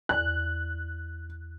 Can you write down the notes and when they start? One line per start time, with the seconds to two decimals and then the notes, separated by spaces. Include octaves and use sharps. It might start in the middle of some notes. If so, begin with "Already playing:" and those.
0.09 E2 D5 F#6